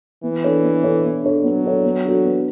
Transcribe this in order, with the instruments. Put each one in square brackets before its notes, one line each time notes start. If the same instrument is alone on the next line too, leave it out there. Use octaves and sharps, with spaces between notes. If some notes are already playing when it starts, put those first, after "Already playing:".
[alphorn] E3 [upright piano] B3
[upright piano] D4 A4 C#5
B3
D4 A4 C#5
B3
D4 A4 C#5
[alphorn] F#3 [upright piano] B3
[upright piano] D4 A4 C#5
B3
D4 F#4 A4
B3